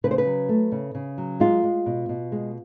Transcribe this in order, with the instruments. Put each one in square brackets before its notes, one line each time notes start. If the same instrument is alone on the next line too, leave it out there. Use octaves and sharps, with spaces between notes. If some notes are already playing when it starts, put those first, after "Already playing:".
[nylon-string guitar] C#3 B4
C5
B4
F#3
A3
C#3
C#3
F#3
G#3 F4
G#3
B2
B2
G#3